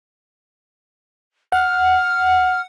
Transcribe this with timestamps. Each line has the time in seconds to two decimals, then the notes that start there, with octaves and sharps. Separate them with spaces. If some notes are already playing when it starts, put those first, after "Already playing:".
1.52 F#5 F6